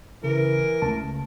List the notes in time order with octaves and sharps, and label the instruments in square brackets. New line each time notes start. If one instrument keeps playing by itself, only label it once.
[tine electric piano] C#3 [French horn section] E3 [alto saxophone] A#4
[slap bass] C#2 C#3 A3 [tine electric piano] A5